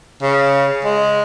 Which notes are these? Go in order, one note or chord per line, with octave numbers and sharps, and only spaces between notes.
C#3
G#3